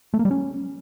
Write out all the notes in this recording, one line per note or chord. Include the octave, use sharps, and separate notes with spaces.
A3
A#3
G3
C#4